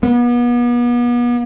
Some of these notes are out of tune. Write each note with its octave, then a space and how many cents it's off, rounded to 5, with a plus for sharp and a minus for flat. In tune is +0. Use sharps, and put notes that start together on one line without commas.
B3 -35